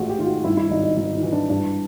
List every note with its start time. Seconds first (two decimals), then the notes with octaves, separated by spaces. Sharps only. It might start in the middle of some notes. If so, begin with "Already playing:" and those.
Already playing: A1 G#2 G#3 F4 F#4 G#4
0.09 G4
0.19 D#3 F4
0.26 F#4
0.44 G2 E4
0.57 E4
0.70 G#1 D#4
0.83 D#4
0.97 G#1 D#4
1.15 E4
1.23 E3
1.32 D4
1.50 G2 D4